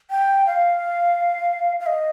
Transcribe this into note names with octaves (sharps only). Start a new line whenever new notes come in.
G5
F5
F5
D#5